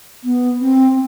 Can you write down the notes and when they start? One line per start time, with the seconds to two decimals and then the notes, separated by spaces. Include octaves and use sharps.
0.24 B3
0.60 C4